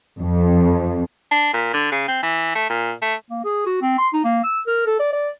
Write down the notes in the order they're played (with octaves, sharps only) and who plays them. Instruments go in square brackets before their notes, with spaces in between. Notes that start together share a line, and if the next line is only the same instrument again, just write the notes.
[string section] F2
[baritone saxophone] D4
A#2
D3
C#3
C4
E3
A3
A#2
A3
[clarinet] A#3
G#4
F#4
C4
C6
D#4
A#3
E6
A#4
A4
D5
D5